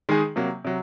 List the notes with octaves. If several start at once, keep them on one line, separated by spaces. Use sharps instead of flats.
D#3 G#3 D#4 G#4
C3 F#3 A#3
C3 F#3